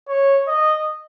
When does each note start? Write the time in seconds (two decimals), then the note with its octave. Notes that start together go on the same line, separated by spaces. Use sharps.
0.08 C#5
0.48 D#5